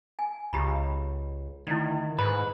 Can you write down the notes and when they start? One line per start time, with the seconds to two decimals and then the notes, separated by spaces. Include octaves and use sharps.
0.19 G#5
0.53 C#2 G4 A#5 B5
1.67 D2 D#3 E4 D5
2.19 G#2 B4 B5